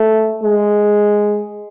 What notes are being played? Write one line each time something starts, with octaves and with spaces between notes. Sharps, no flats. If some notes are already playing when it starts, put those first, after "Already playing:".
Already playing: A3
G#3